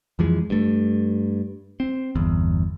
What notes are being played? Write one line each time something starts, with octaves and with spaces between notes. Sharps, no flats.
F2 E3 F3 G#3
G2 A3
C4
G1 E2